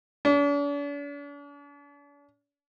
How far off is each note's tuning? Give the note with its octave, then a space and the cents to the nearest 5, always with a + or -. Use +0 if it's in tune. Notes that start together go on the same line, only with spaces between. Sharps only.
D4 -45